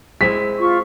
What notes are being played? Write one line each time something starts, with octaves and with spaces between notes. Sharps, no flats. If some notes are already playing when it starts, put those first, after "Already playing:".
G#3 C4 E4 B6
F4 C#6